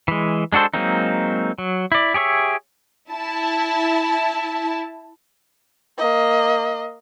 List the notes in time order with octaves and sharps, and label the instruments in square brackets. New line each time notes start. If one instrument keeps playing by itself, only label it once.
[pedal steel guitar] E3 G#3
G#3 D4 F#4 A4 C5
F#3 G#3 A#3 C4 D#4
F#3
E4 D5
G4 G#4 C#5 E5
[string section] E4 A5
[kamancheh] A#3 D#5